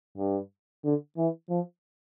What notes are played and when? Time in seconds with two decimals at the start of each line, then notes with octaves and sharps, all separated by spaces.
0.18 G2
0.84 D3
1.17 E3
1.50 F3